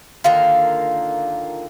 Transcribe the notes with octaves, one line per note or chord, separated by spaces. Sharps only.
D3 D#3 A#3 F4